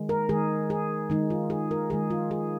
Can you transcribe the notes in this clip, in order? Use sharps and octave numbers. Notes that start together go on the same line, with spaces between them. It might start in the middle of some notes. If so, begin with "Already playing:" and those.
Already playing: D#3 G#3
A#4
D#3 G#3 G#4
G#4
D#3 G#3 D#4
F4
G#4
A#4
D#3 G#3 G#4
F4
G#4